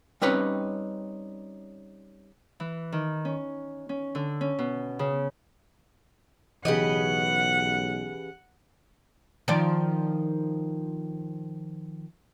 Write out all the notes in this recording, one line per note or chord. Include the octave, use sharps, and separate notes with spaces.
G3 C4 C#4 D#4 B4 C#5
E3
D#3
C#4
C#4
D3
C#4
B2
C#3
B1 C#3 E3 G4 B4 D#5 F#5
D#3 F3 D5